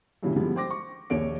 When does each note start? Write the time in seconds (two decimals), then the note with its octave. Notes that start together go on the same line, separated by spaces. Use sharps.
0.23 G2 A#2 C#3 E3 G3
0.36 D3 F3 G3 G#3 B3 E4
0.55 C5 G5 C6 D6 A#6
0.71 C#6
1.10 A#1 D#2 C#5 D7